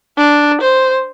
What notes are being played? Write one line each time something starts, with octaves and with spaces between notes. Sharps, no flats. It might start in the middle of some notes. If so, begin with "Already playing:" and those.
D4
C5